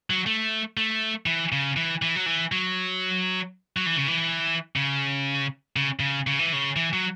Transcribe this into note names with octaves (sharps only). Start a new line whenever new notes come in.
F#3
A3
A3
E3
C#3
E3
E3
F#3
E3
F#3
F#3
E3
C#3
E3
C#3
C#3
C#3
C#3
E3
C#3
E3
F#3